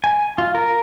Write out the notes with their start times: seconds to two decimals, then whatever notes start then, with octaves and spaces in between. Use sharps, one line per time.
0.04 G#5
0.38 F4
0.55 A#4